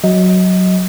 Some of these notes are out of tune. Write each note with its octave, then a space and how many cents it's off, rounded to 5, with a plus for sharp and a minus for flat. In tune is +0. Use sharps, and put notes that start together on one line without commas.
F#3 +0 D#5 +20